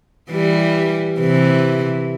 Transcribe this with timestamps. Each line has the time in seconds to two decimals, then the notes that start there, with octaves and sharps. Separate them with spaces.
0.30 E3 G3
1.19 C3 E3